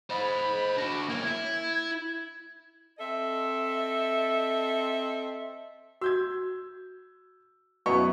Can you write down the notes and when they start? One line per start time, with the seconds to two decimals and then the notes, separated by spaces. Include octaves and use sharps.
0.10 C5 D#5 B5
0.77 D4 F#4 A#6
1.09 A#3 C#4 G#6
1.25 E4
2.99 C4 A4 D#5 E5
6.02 F#4 E6 G6 G#6
7.86 F#2 B2 B3 E4 D5 F5 B5 C#6